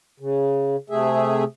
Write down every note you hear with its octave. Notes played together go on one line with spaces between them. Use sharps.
C#3
C3 A3 G#4 E5